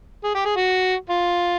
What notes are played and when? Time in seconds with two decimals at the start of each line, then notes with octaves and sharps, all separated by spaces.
0.24 G#4
0.35 G4
0.46 G#4
0.56 F#4
1.10 F4